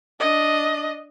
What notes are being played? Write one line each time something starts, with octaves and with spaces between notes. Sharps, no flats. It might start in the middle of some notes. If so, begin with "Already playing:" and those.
D4 D#5